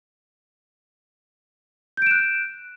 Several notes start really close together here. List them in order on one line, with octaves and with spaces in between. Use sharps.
G6 D7 E7 F#6